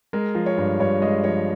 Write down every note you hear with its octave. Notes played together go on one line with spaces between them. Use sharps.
G#3 A#4
F3
C#5
G2
G2 C#5
G#3 D#5
F3 C#5